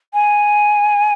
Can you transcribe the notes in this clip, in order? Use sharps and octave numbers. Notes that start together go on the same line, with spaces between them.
G#5